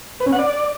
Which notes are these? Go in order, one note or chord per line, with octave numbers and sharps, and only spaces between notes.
B4
C#4
F#5
D5